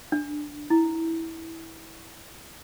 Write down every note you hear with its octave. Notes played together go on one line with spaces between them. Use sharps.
D4
E4